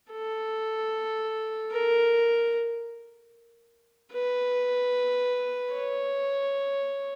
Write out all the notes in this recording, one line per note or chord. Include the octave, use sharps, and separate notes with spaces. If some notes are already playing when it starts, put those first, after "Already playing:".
A4
A#4
B4
C#5